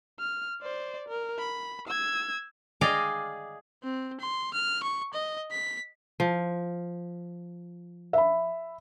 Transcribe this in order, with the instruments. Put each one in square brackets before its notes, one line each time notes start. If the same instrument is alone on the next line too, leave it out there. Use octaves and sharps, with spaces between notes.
[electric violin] F6
C5 D5
A#4
B5
E6 G#6
[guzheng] G#4 D5 D#5 F5 G5
[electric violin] C4
C6
F6
C#6
D#5
B6
[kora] F3
[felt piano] E5 B5